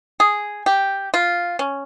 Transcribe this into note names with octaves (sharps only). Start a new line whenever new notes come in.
G#4
G4
F4
C#4